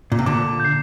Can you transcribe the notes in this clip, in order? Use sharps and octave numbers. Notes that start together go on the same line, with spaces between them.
A#2
C3
A#2 D3 D6
G6 C7